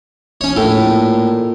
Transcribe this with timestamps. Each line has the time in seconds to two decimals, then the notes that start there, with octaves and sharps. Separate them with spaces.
0.41 C#4 C#5
0.56 A#1 A2
0.84 A#2